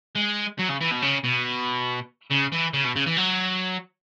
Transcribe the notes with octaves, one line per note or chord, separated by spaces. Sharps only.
G#3
F#3
C#3
E3
B2
C#3
B2
C#3
E3
C#3
B2
C#3
E3
F#3